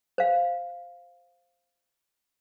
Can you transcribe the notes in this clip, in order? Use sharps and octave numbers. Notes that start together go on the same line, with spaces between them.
C5 F5